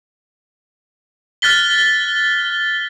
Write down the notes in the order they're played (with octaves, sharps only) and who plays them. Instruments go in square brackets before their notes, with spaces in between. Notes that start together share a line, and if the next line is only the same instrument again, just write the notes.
[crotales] F6 F#6 A6 B6 G7